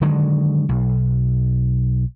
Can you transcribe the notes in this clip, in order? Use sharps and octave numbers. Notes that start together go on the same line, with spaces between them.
D3 D#3 F#3 G#3
B1